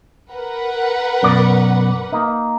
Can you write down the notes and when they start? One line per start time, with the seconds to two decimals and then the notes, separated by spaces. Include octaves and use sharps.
0.33 A#4 B4 F#5
1.23 F#2 B2 D5
2.12 A#3 D#4